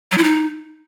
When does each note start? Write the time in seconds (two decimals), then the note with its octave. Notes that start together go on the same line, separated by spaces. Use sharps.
0.12 F#3
0.18 E4
0.24 D#4